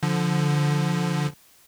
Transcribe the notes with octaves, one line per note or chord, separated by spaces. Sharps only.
D3 F3